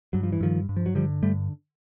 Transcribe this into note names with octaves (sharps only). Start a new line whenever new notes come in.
G2 F#3
F3
E3
G2 D#3 F3
G2
F3
F#3
D3 F3 G3
G2 G3 A3